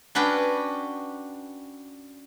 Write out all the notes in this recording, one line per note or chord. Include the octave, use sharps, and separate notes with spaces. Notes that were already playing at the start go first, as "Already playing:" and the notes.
C#4 D4 F#4 B4 G5